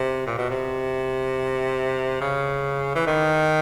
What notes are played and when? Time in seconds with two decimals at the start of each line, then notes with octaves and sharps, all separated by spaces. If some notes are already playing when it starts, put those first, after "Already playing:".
Already playing: C3
0.26 A#2
0.38 B2
0.50 C3
2.21 C#3
2.95 E3
3.07 D#3